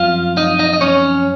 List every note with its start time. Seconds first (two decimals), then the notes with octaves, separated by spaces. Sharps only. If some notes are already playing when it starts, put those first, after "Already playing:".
Already playing: F#2 F3 C4 F4 F5
0.37 D#4 D#5
0.59 D#4 D#5
0.73 D#5
0.81 C#4 C#5